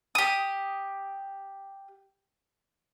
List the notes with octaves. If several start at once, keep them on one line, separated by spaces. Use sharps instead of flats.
G4 D#6